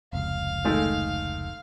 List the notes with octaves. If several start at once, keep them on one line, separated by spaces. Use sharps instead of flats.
F1 C#2 F5
D#3 G#3 A3